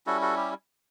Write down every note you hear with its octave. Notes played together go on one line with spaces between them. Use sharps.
G3 C#4 E4 F#4 A4
F#4 A4
G4